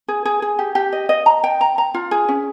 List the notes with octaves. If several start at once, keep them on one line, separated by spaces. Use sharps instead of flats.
G#4
G#4
G#4
G4
G4
D#5
D#5
A#5
G5
A#5
A#5
F4
G#4
C#4